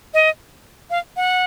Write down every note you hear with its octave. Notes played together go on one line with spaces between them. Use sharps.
D#5
F5
F#5